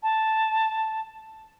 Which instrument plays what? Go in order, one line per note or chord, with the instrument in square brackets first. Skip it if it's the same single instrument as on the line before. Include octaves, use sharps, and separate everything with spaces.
[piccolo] A5